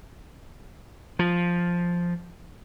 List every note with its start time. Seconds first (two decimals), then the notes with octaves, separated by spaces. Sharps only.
1.19 F3